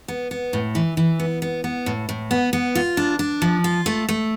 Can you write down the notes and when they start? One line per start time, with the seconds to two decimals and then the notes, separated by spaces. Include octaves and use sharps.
0.08 B3
0.31 B3
0.53 A2
0.75 E3
0.97 E3
1.20 B3
1.42 B3
1.64 B3
1.86 A2
2.09 A2
2.31 B3
2.53 B3
2.75 F4
2.97 D4
3.19 D4
3.42 F3
3.64 F4
3.86 A3
4.09 A3